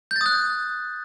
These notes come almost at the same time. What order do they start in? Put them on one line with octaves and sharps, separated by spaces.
G6 A6 D#6 F#6